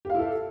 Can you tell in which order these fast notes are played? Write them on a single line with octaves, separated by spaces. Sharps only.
G4 F5 E4 A4